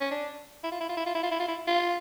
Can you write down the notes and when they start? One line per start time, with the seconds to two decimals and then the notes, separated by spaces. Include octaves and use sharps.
0.01 C#4
0.11 D4
0.64 E4
0.72 F4
0.81 E4
0.89 F4
0.97 E4
1.06 F4
1.15 E4
1.23 F4
1.31 E4
1.40 F4
1.48 E4
1.67 F4